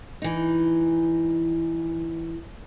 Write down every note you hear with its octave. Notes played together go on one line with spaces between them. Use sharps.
E3 D#4